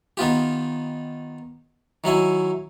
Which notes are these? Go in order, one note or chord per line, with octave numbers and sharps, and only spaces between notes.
D#3 B3 F4 G4
D#3 F#3 E4 G#5